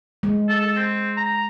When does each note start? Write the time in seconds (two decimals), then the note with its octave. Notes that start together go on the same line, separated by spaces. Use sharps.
0.23 G#3
0.49 A4
0.62 A4
0.76 C4
1.17 A#5